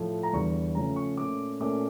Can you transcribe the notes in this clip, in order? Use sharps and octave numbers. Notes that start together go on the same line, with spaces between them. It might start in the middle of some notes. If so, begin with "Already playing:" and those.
Already playing: A2 F3 A3
A#5
E2 D3 G3 C#6
C#3 F3 A3 C#4 A#5
C#6
A#2 A3 C#4 D6
A#2 A3 C#4 D6